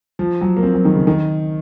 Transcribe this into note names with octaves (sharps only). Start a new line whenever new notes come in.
F3
F#3
A#3
C4
F#3
D#3
C#3
D#3